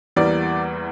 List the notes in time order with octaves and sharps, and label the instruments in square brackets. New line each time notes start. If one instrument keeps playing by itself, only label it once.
[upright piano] E2 E3 G3 A#3 D5